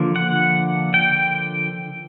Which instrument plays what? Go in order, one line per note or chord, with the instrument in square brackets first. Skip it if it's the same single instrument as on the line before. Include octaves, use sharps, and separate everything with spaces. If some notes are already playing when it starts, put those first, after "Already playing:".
Already playing: [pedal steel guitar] D3 F3 A#3
F#5
G5